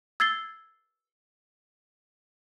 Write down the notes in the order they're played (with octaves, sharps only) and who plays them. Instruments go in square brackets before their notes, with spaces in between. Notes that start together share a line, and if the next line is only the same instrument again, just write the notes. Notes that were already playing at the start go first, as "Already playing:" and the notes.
[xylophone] E6 G#6 A6 C7 G7